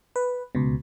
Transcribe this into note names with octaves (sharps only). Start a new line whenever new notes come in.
B4
C#2 B2